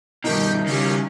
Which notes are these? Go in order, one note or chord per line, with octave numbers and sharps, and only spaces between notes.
G2 B2 D#3 D#4 G4 G5
C#3 G3 C#4